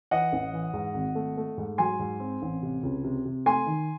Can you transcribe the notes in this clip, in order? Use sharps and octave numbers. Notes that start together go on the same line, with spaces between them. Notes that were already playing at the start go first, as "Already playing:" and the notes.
E3 D#5 F#5
A1
E3
G#2
G#1
A3
A3
G#2
F#3 G#5 C6
G#2
C4
A1
C3
C#2
C3
C3
A3 G#5 C6
D#3